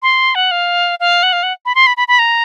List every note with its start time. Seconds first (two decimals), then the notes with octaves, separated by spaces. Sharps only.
0.02 C6
0.35 F#5
0.51 F5
1.00 F5
1.23 F#5
1.33 F5
1.43 F#5
1.66 B5
1.75 C6
1.87 B5
1.97 B5
2.08 B5
2.19 A#5